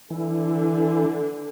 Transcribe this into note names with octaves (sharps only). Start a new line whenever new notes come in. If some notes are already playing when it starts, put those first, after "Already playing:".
D3 E3